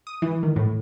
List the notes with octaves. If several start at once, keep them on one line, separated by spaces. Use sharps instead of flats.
D#6
E3
D#3
A2